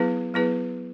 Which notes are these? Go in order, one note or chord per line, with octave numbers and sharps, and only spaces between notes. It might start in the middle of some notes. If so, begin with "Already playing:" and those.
Already playing: F#3 B3 E4 G#4 B4
F#3 B3 E4 G#4 B4